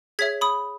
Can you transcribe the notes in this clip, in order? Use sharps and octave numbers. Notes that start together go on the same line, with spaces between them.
G#4 C#5 E5 G#6 B6
B5 D#6